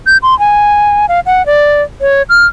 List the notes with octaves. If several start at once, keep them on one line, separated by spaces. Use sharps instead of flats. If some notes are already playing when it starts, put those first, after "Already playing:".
G6
C6
G#5
F5
F#5
D5
C#5
F6